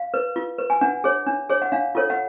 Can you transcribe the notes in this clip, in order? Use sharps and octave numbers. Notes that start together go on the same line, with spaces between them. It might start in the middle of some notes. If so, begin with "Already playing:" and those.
Already playing: F5
B4
F4
B4
G#5
D4 F#5
G#4 C#5
D4
G#4 C#5
F#5
D4 F5
F4 A4 C#5
F#5